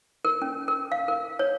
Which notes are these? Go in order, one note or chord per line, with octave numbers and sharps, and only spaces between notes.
A#4
C#4
A#4
F5
A#4
C#5